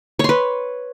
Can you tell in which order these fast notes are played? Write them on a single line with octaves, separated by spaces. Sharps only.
C#5 C6 B4